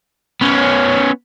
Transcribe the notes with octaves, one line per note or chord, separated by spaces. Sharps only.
B3 C#4